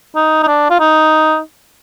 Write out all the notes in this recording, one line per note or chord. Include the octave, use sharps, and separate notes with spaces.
D#4
D#4
D4
F4
D#4